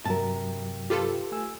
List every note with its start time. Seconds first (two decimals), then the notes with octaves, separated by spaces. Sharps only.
0.05 G2 C3 F#3 A#4 A5
0.90 F4 G4 A4 B4
1.32 A3 G#5 E6